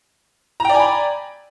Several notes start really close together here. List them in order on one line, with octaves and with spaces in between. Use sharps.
A#5 G5 D5 G#5 B5